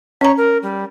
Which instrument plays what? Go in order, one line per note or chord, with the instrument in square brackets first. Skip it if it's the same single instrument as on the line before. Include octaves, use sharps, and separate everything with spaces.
[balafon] C#4 A#5 [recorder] C#5
[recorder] A#4
G3